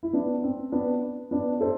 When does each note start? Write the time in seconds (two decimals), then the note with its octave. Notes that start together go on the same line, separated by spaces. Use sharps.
0.03 E4
0.13 B3 D4
0.43 C4
0.72 B3 D4
1.31 B3 D4
1.61 A4 C5